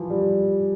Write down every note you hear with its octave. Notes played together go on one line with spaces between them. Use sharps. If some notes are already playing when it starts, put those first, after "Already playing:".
Already playing: E3 F3
G3